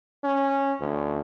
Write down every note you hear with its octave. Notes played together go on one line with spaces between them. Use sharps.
C#4
D2